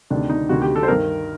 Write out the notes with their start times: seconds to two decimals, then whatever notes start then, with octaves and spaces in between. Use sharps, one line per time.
0.10 D2 C3 D#3 D4
0.29 D#4
0.49 D2 C3 D#3 F#4
0.62 G4
0.76 A4
0.83 C5
0.88 G2 D#3 A#4